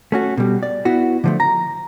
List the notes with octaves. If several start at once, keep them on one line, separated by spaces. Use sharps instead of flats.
A3 C#4 F#4
B2 G3
D5
B3 E4 F#4
D3 F3 A3
A#5